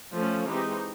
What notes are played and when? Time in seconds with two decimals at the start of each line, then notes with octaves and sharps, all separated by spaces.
0.15 F3 A3 C#4
0.47 E3 G#3 C4 D#4 G4